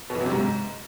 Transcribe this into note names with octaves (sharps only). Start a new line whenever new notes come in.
B2
E3
F#3
C3
G#2